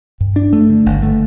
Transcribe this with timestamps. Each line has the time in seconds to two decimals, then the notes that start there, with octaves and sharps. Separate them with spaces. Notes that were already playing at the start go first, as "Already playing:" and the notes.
0.20 G2
0.36 D4
0.53 A3
0.70 D3
0.86 G1
1.02 A3